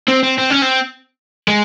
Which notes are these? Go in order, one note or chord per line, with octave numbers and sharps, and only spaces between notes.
C4
C4
C4
C#4
C4
G#3